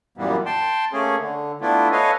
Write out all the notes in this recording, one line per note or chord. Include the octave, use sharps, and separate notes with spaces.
F#2 A#2 E3 G3 A#3 B3
G5 A5 C6
A3 A#3 C#4 G#4
D3
A3 B3 D4 E4 F4
A4 B4 C#5 D#5 F5 G#5